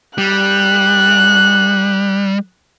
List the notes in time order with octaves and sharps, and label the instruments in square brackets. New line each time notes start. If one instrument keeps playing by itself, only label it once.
[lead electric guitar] G3 [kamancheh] F#6